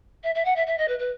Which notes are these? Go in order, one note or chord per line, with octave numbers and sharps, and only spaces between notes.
E5
E5
F#5
E5
E5
D#5
B4
B4